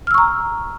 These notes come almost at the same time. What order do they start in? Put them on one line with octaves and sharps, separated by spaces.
F6 E6 C#6 A#5